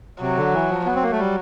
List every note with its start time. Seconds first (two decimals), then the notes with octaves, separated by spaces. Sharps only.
0.21 C3 F#3
0.37 D3
0.54 E3
0.70 F3
0.86 F#3 B3
0.95 C4
1.03 A#3
1.12 A3
1.19 G3